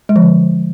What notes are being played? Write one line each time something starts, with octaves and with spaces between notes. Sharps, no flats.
G#3
F3
D3